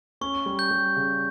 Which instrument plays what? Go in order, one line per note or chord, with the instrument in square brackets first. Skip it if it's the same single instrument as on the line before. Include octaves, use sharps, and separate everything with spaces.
[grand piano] C#4 [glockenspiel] C#6
[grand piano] G3
[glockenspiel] G6
[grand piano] G3
C#3